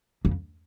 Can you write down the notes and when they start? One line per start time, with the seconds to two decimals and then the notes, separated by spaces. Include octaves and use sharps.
0.25 F2